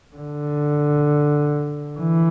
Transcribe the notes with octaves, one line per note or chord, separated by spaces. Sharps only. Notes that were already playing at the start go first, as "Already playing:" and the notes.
D3
E3